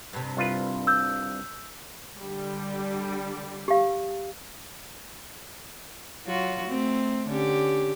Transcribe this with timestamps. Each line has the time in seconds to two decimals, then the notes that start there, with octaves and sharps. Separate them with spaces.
0.13 G2 C3
0.37 C2 F4 B4
0.87 E6 G6
2.18 D3 G3
3.68 G4 F5
6.26 F#3 F4 F#4
6.67 A3 C4
7.28 D3 C#4 G4